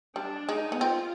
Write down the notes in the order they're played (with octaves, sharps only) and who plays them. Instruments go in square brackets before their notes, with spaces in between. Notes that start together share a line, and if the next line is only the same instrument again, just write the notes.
[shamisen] G3 [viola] D4
[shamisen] G#3 [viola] D#4
[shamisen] B3
[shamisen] C4 [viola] F4